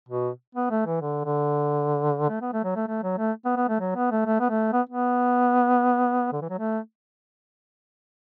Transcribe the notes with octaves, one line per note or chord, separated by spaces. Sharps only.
B2
B3
A3
E3
D3
D3
A3
B3
A3
F#3
A3
A3
F#3
A3
B3
B3
A3
F#3
B3
A3
A3
B3
A3
B3
B3
D3
E3
F#3
A3